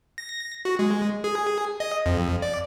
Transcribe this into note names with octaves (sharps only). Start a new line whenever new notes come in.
A#6
F#4
G#3
G#4
D#5
F2
D5